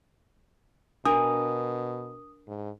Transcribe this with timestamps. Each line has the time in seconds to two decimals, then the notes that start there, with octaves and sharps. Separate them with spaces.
1.05 B2 D4 A#4 D#6
2.48 G#2